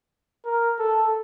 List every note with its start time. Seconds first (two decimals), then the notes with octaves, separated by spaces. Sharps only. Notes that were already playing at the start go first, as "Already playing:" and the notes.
0.45 A#4
0.79 A4